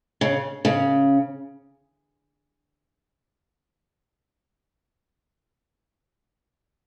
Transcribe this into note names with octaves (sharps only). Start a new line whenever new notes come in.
C#3
C#3